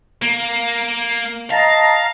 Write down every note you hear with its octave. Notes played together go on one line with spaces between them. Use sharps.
A#3
D#5 F5 A5 A#5